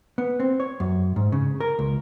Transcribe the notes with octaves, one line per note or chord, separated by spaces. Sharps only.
B3
C4
C#5
F#2
G#2
C#3
A#4
C#2